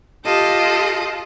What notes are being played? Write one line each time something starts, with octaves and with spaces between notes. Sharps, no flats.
F4 G4 A4 D#5